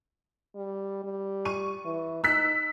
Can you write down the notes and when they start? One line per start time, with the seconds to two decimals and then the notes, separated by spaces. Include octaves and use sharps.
0.56 G3
1.04 G3
1.45 C#6 D#7
1.85 E3
2.24 D#4 E6 F#6 B6